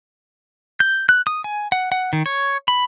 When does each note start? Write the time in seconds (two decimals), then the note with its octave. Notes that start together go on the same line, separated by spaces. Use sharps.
0.80 G6
1.09 F#6
1.27 D#6
1.44 G#5
1.72 F#5
1.92 F#5
2.13 D#3
2.26 C#5
2.68 B5